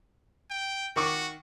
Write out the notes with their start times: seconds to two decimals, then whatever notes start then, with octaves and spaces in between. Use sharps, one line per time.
0.51 G5
0.96 D#3 F#4 C#6 D6